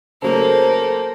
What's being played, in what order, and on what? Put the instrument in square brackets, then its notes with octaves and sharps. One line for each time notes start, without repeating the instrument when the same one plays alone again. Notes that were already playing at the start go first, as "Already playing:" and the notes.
[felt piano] C#3 F#3 A3 [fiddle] A#3 [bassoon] A4 [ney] C5